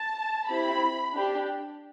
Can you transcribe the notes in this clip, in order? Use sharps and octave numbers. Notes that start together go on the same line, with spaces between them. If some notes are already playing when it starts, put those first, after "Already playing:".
Already playing: A5
C4 E4 G4 B5
D4 G4